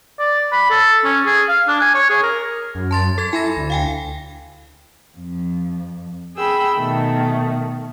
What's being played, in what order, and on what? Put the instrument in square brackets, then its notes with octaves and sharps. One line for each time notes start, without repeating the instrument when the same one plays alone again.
[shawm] D5
B5
A4
C#4
G#4
F5
D4
G#5
C#5
G#4
A#4
[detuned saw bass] F#2
[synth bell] A5 C6 A6
A4 G#6
[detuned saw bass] E4 [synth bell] G#5 B5 A#6
[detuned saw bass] D2
[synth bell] F5 G5 G#5
[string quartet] F2
G#4 G5 B5 E6
B2 D#3 A3